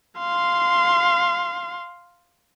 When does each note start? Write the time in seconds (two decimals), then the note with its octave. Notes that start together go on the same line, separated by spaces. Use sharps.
0.19 F5 C6